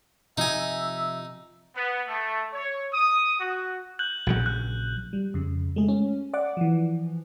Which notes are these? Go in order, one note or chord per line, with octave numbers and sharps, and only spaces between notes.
C3 F3 D#4 E5 G#5
B3
A3
C#5
D#6
F#4
F#6 G6 F#7
A#1 C#3 F#3
F#6
G3
F2 C#3
G#3 A3 G#4
C#4
D5 F#5 D6
E3 F3